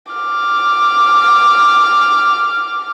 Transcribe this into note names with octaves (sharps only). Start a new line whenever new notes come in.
D6 F6